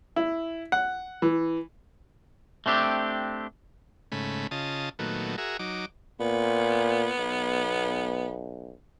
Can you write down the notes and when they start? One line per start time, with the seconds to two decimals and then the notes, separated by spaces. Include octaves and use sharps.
0.16 E4
0.72 F#5
1.22 E3
2.66 A3 C4 D4 G4
4.12 G#2 C#3 A3 B5
4.51 C#3 F4 D#5 A5
4.99 A#2 D#3 F#3 A3 B3
5.38 F#4 G#4 A#4 E5
5.59 F#3 D#4 D6
6.20 A#2 B3
7.18 B1